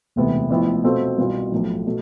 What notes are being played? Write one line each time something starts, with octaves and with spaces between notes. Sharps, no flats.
E1 D2 C3 E3 B3
A1 A2 F3 B3 E4
B2 A3 C4 F4
C2 B2 B3 F4
B1 A2 F3
B2 A3